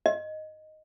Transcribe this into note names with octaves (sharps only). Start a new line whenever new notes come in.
D#5